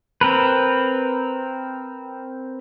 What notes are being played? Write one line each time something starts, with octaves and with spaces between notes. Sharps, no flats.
C4 A#4 B4